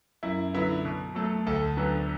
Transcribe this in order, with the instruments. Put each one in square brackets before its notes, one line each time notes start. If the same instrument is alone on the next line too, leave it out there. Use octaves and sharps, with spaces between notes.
[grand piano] F#2 E4
D3 F#3 B3 E4
B2
F#3 A3 A4
D2 A4
D3 F#3 B3